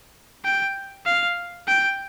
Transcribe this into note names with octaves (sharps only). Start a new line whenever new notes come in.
G5
F5
G5